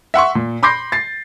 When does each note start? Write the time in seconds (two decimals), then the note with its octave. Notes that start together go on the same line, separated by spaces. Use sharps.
0.14 E5 F#5 C6 C#6
0.35 A#2
0.63 B5 C6 D6 G6 A#6 C7
0.92 A6 C7